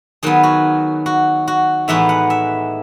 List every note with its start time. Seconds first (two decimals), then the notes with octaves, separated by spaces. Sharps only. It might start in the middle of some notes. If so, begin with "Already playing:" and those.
0.23 D#3 F#3 B3 G#4
0.43 F#4
1.06 F#4
1.48 F#4
1.88 A2 E3 G#3 B3 D#4 E5
2.09 F#5
2.30 E5